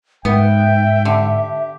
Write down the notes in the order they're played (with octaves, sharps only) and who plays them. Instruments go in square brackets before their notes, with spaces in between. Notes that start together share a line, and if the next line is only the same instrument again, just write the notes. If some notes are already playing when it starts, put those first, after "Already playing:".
[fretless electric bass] G#2 [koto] B3 [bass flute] E5 [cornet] G5
[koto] D3 [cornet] G4